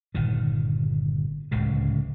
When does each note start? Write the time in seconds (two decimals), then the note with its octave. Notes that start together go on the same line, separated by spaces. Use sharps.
0.15 G1 A#2 D#3
1.51 D1 C#2 A2 C#3